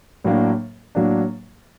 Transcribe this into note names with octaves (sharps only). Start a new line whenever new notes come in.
A2 F#3 A#3 D4
A2 F#3 A#3 D4